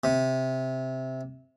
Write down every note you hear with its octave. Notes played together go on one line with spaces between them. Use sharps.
C3